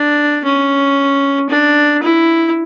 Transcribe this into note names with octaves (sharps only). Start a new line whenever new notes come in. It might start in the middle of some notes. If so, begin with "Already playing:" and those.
Already playing: D4
C#4
D4
E4